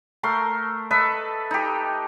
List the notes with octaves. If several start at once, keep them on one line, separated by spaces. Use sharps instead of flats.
A3 A#4 C6
A4 B4 D#5 E5
D#4 G4